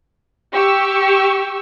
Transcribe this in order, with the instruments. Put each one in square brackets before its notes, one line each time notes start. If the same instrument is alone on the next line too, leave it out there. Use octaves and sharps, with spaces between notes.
[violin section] G4 C#6 E6